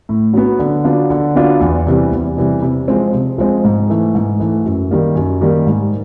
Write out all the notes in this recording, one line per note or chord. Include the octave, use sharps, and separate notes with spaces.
A2
F#3 B3
D3
F#3 B3 D4 F4
D3
F#3 B3 D4 F4
E2
C3 E3 G3
E2
C3 E3 G3
C3
F3 G#3 C4
C3
F3 G#3 C4
G#2
E3 A3
G#2
E3 A3
F#2
D#3 G3 A#3
F#2
D#3 G3 A#3
G#2